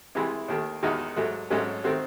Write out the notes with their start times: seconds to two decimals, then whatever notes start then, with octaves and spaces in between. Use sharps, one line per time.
0.15 C2 C3 E3 G#3
0.48 D#2 D#3 A3
0.82 E2 D#3 G#3 D#4 F#4
1.16 G#2 F#3 A3
1.50 G#1 G#2 F#3 A3 C#4
1.84 D#3 A3 C4 F#4